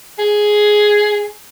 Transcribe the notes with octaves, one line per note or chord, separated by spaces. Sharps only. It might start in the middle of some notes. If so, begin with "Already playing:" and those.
G#4